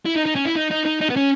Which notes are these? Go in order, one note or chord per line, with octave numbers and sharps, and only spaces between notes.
E4
D#4
D#4
C#4
E4
D#4
D#4
D#4
D#4
B3
C#4